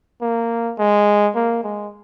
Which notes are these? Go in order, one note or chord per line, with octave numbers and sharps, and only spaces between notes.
A#3
G#3
A#3
G#3